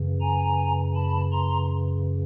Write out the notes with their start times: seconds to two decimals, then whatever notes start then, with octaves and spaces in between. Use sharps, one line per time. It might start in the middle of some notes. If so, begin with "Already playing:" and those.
Already playing: F#2 C#3 E3
0.21 G#5 A#5
0.95 A5 B5
1.32 A#5 C6